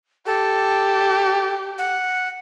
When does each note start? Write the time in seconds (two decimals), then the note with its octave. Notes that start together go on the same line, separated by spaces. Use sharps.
0.26 G4 A4
1.78 F#5